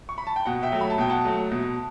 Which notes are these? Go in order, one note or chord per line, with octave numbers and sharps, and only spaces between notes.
C#6
B5
A5
G5
B2 F#5
E5 G5
F#3 A3
B5
A5
B2 G5
F#5 A5
F#3 A3
B2